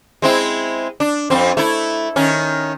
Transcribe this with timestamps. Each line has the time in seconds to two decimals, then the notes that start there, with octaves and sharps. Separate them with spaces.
0.22 G#3 C4 E4
1.00 D4
1.30 F2 C4
1.57 A3 E4
2.16 D#3 C#4